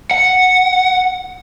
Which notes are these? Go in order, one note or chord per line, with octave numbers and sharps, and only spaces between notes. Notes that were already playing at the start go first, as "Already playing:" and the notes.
F#5